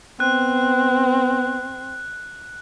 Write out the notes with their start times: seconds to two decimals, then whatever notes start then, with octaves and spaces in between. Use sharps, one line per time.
0.20 B3 C4 F#6